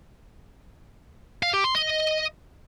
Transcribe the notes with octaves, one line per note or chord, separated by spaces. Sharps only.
F5
G4
C6
D#5